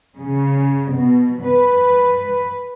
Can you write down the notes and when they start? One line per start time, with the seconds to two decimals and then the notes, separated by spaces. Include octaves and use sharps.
0.18 C#3
0.94 B2
1.44 B4